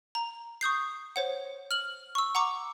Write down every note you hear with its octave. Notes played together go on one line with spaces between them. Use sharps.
A#5
C#6 D#6 G6 C7
C5 C#5 F#5
F6 F#7
C#6 E6
F#5 A#5 C#6 D6